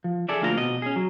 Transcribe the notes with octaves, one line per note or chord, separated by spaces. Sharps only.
F3
G#4 A4 D5 E5
D2 A#2 F3 F4 A5 A#5
B2 D#5
C#4 G#4
F#3